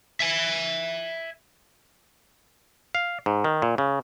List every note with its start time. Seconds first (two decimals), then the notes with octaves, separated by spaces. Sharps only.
0.20 E5 G#5
2.95 F5
3.26 G#2
3.44 D#3
3.62 A#2
3.78 C#3